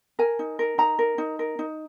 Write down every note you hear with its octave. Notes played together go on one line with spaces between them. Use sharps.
A#4 G#5
D#4
A#4
D#4 A#5
A#4
D#4
A#4
D#4